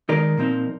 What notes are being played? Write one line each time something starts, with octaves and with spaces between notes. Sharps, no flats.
D#3 G#3 D#4 A#4 D5
A#2 F3 C4 D#4